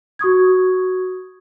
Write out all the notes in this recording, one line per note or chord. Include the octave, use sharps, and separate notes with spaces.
F#4 C#6 D#6 G#6